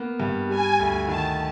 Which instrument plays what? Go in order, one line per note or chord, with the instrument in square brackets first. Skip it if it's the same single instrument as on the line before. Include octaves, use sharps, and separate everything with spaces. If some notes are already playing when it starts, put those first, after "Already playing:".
Already playing: [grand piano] A#3 B3
G2
[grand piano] G3 [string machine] G#5
[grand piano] D2
[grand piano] D#3 [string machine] A5